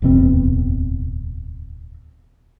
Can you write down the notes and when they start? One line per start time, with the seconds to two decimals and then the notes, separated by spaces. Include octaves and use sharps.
0.02 D1 E2 B2 C4